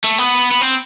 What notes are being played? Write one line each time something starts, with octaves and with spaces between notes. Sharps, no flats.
A3
B3
B3
C4